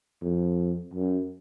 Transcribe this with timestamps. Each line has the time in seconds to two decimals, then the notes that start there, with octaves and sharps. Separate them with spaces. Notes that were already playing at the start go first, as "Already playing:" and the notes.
0.22 F2
0.94 F#2